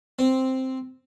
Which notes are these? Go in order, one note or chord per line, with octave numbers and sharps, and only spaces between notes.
C4